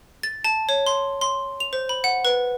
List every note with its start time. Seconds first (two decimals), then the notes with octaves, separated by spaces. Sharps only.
0.23 A6
0.44 A5
0.69 C#5
0.86 C6
1.21 C6
1.60 F7
1.73 C5
1.89 B5
2.04 F#5
2.25 B4